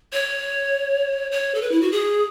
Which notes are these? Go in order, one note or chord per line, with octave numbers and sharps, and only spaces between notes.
C#5
C#5
A4
B4
E4
F#4
G#4